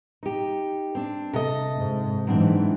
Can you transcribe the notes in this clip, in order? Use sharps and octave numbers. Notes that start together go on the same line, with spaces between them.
D#4 G4
C4 D4
C3 A4 D#5
G#2
G#2 E3 F#3 C4 D4